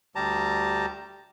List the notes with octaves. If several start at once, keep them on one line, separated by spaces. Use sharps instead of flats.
D2 G3 G4 A5 A#5